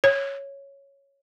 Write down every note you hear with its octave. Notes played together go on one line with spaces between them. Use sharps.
C#5